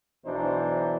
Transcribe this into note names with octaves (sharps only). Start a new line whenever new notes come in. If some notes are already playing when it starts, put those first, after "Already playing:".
B1 B2 E3 D4 D#4 C5